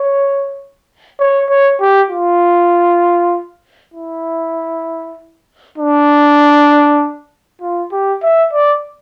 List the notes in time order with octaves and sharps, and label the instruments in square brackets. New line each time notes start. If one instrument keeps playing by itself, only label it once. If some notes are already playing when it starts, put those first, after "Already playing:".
Already playing: [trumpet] C#5
C#5
C#5
G4
F4
E4
D4
F4
G4
E5
D5